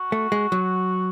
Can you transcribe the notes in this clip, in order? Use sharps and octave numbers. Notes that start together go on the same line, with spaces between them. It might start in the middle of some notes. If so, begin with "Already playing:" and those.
Already playing: F#4
A3
G#3
F#3